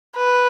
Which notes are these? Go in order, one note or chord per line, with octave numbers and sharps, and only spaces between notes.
B4